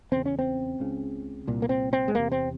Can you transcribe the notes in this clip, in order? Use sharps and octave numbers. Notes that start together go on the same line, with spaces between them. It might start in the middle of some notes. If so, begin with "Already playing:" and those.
E2 C#3 C4
C#4
C4
C#2 C#3
C2 A#2
A#3
C4
C4
G#3
E2 C3 A#3
C4